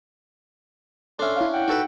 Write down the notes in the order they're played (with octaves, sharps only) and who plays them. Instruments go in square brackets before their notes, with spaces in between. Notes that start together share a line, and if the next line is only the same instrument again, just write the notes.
[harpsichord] C#4 D4 [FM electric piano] A4 E5 [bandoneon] C6
[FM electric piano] E4 C#5 F5
[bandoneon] F#5 G5
[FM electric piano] D#4 [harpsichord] F#4 A4 B4